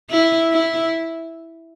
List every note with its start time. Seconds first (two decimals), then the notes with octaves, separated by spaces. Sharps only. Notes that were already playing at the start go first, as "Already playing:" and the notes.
0.10 E4
0.52 E4